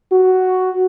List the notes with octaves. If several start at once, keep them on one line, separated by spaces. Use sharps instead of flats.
F#4